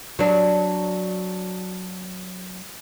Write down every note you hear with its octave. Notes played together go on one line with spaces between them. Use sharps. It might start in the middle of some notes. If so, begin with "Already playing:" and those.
F#3 D4